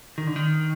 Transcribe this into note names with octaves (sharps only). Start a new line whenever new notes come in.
D#3
D3
D#3